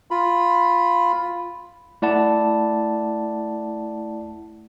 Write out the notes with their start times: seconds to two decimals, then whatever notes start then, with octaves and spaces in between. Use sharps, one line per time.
0.11 F4 B5
2.02 A3 E4 D5 F#5 A5